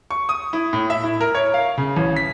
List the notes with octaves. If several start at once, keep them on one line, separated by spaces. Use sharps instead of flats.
C#6
D#6
E4
A2
E5
E4
A#4
C#5
F5
C#3
A1
B6